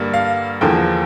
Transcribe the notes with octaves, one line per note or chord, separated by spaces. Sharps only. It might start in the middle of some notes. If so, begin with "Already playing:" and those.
Already playing: G2 D3 G3 A#3
F5
E2 D3 F3 A#3 G5